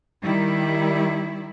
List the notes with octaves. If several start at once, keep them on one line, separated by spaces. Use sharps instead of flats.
D#3 G3 E4